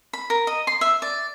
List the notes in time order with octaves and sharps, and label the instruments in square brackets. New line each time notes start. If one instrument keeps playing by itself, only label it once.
[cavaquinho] B5
A#4
D#5
C6
E5
D5